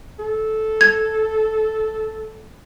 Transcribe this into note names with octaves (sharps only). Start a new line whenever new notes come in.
A4
G#6